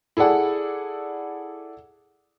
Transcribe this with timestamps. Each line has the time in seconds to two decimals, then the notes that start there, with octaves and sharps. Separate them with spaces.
0.17 E4 G#4 A4 D5 F#5